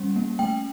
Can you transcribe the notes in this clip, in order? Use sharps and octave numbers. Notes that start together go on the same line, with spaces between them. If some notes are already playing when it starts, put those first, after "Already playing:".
Already playing: G3 C#4
A#3
A3 G5